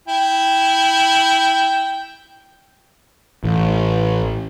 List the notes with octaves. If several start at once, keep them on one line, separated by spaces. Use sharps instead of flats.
E4 G5
A1